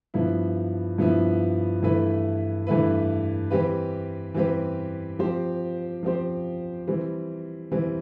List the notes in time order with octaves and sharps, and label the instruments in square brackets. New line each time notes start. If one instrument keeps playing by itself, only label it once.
[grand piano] G2 F3 B3 E4
G2 F3 B3 E4
G2 E3 A3 E4 B4
G2 E3 A3 E4 B4
E3 G3 C4 G4 B4
E3 G3 C4 G4 B4
F3 C4 G4 C5
F3 C4 G4 C5
E3 G3 C4
E3 G3 C4